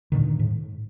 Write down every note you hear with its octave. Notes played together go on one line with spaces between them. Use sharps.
G2 A#2 D3 D#3
G#2